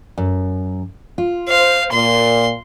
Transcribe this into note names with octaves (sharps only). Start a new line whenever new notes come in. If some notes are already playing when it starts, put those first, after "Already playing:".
F#2
F4
C5 F5
A#2 C6